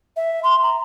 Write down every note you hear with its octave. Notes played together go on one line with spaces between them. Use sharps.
E5
C6
A#5